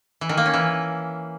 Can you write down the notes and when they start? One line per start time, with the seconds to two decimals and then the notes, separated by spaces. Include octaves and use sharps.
0.21 E3
0.29 D#3
0.37 A#3
0.46 C#4
0.54 E3